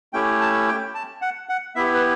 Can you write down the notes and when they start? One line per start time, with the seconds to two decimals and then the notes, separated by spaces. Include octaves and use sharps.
0.13 A3 C#4 E4 G4 G5
0.41 A5
0.68 G5
0.95 A5
1.22 F#5
1.49 F#5
1.76 B3 E4 G4 E5
1.94 B4